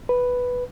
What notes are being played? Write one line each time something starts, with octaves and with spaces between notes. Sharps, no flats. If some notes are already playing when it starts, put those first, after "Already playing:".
B4